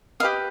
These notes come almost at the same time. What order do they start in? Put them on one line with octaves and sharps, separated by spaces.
D#5 F5 G4 B4